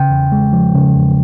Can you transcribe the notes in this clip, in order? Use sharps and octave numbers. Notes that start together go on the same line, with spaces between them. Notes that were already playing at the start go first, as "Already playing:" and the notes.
Already playing: C#3 G5
E2
G#3
F3
C#3
E2